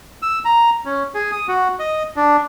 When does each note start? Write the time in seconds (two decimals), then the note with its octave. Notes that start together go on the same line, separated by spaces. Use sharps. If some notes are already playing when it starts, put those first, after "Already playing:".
0.22 E6
0.45 A#5
0.85 C#4
1.15 G#4
1.32 D#6
1.48 F#4
1.79 D#5
2.16 D4